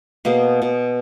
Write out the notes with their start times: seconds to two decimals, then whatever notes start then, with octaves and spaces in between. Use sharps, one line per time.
0.25 B2 A#3 G#4
0.62 B2